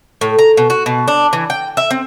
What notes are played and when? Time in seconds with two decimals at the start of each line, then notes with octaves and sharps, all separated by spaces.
0.21 A2
0.39 A#5
0.57 B2
0.70 F#4
0.86 B2
1.08 D4
1.33 E3
1.50 G5
1.77 E5
1.91 C4